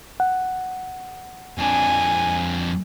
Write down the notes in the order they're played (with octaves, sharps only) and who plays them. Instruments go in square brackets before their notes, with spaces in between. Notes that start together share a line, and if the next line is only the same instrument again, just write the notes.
[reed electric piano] F#5
[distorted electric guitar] F2 D4 [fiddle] G#5